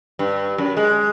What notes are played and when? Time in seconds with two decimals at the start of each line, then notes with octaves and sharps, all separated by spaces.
0.19 G2
0.58 F#2
0.77 G#3